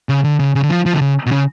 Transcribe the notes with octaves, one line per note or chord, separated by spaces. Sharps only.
C#3
D3
C#3
C#3
D3
F3
F3
D3
C#3
B2
C#3